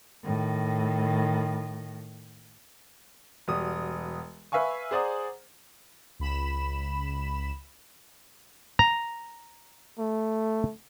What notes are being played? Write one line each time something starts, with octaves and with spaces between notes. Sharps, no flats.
A2 D#3
E1 G3 F#4 D#6
B4 E5 F5 G#5 C#6
G#4 C5 D5 F#5 A#5 D#6
C#2 B5 E7
A#5
A3